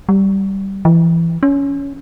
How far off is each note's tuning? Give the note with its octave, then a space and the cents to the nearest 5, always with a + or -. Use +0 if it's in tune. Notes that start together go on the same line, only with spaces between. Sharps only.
G3 -10
E3 +20
C#4 +15